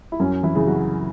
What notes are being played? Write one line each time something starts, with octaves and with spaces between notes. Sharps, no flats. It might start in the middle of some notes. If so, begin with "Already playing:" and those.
E4
F#2 C#4
E3 E4
C#3 E3
F#3 F#4